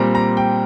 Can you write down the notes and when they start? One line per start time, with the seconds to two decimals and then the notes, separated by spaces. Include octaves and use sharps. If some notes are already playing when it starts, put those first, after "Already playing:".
Already playing: A#2 G3 C4 A#5
0.15 A#5
0.37 G5